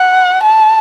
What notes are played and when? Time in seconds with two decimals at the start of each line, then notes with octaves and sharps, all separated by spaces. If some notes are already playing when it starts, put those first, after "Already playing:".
Already playing: F#5
0.43 A5